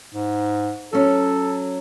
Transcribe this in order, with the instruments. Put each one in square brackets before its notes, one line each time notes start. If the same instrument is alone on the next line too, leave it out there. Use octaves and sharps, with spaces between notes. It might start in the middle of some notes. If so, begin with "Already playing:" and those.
[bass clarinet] G#2
[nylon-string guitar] F#3 C#4 [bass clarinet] A4